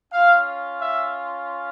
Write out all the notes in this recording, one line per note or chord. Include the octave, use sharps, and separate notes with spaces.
C#4 F4 F5
E5